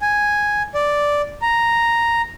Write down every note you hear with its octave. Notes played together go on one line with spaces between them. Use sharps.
G#5
D5
A#5